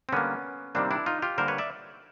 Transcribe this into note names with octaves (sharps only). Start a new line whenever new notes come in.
C4
D3 G3 A#3 B3 C#4
C3 D#3 G3 A#3 C4 D4
D4 E4
D#4 F4
F4 G4
D3 G3 A#3 A#4 C5
B4 C#5
D5 E5